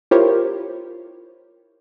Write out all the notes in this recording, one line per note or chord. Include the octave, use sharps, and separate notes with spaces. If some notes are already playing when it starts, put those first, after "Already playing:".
E4 F4 G4 A#4 C5 C#5